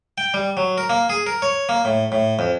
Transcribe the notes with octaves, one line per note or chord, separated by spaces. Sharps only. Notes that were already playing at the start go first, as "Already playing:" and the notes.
G5
G3
F#3
A#4
A#3
G#4
A#4
C#5
A#3
A2
A2
F2